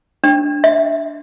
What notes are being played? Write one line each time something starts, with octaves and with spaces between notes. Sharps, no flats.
D4
E5